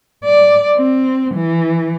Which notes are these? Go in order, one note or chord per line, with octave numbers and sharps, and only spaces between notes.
D5
C4
E3